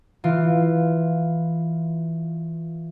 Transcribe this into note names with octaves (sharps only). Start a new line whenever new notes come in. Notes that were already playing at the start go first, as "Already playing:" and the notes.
E3 F4